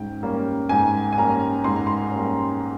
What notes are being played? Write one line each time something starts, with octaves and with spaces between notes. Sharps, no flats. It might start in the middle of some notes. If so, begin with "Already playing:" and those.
Already playing: G#2 G3 C#4 G5
G3 A#3 C#4
G#2 G#5
G#5
G3 A#3 C#4 A#5
G#2 C6
A#5
C6
G3 A#3 C#4